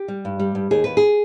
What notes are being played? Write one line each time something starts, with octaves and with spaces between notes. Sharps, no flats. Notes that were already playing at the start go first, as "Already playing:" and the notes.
Already playing: G4
G3
G2
G3
G2
D#2 G#4
D#2 B4
G#4